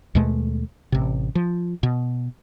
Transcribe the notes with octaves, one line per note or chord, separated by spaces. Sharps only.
D#2 B2 G#3 A3
A1 C3
F3
B2